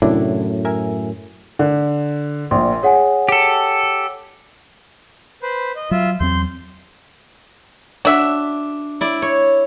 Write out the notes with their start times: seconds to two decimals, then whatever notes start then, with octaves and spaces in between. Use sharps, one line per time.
0.02 F#2 A2 C3 D4 E4
0.65 A#4 E5 G#5
1.59 D3
2.51 A#1 A#2 C6
2.83 G#4 C#5 F#5 G#5
3.29 G4 A4
5.42 B4 C5
5.76 D#5
5.91 F#3 F4 E5
6.20 E2 F#3 C4 C6 G6
8.05 D4 F#4 E5
9.01 E4 D5
9.22 C#5